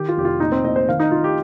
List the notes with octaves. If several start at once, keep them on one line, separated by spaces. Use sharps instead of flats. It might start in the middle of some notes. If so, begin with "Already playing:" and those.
Already playing: D#3 G4
F4
F1 G4
F4
A#2 D#4
C4
A#2 D#5
C5
D#3 F5
D#4
D#3 F4
G4